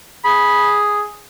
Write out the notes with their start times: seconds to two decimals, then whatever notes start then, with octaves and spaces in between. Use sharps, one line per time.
0.25 G#4 B5